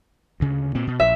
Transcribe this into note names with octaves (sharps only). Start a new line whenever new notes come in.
D2 C#3
A#2 C4
B2
A#1 E5